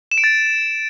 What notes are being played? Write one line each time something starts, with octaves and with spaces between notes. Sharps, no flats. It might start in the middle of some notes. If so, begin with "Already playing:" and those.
E7
D7
A6